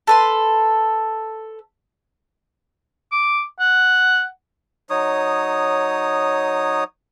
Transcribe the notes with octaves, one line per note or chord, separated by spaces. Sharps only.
A4 B4 C6
D6
F#5
F#3 D#4 C#5 D#6